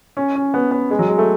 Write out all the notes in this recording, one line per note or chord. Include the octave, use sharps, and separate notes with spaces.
C#4
C#4
B3
B3
G#3
F#3
G#3
A3